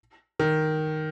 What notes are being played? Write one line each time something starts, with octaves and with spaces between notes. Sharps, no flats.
D#3